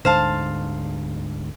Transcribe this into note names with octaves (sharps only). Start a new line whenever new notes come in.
D2 G#2 D3 C5 F5 A5